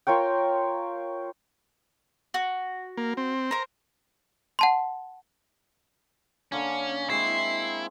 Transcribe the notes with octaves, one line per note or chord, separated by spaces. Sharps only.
F4 A#4 C#5 G5
F#4
A#3
C4
A#4 C5 A#5
F#5 A5 C6
D3 A#3 C#4
G#3 C4 E4 C#6 C7